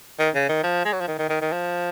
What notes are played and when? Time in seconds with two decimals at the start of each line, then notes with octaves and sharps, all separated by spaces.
0.19 D#3
0.34 C#3
0.49 D#3
0.63 F3
0.85 G#3
0.93 F#3
1.00 F3
1.08 D#3
1.19 D#3
1.29 D#3
1.41 D#3
1.52 F3